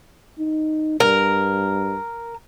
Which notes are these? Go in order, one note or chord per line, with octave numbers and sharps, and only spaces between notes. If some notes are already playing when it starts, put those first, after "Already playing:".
D#4
G2 A#4